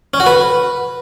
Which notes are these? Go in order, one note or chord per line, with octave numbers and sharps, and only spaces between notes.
C#4
F#4
B4